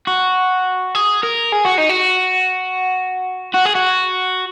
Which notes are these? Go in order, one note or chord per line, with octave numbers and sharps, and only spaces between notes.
F#4
G#4
A#4
G#4
F#4
D#4
F#4
F#4
G#4
F#4